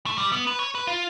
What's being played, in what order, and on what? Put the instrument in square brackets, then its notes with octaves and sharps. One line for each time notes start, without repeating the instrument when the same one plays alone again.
[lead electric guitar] A3
G3
B3
B4
C#5
B4
F4